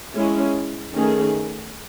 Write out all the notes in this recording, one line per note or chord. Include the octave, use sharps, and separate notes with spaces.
G#3 C#4 E4
D#3 A3 C#4 G#4